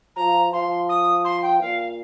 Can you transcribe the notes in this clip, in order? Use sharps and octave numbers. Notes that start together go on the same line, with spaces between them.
F3 A#5
F3 C6
D#6
C6
G5
A#2 F5